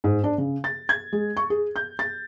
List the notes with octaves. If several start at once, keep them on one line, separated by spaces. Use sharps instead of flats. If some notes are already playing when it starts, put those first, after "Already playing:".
G#2
D4
C#3
A6
G#6
G#3
C#6
G#4
G6
A6